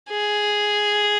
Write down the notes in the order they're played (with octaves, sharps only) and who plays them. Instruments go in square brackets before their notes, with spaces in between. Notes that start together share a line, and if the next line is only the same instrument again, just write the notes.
[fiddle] G#4